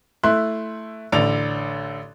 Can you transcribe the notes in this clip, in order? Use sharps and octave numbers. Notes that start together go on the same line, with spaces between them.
A3 E4 C6 F#6
A1 D3 D5 F7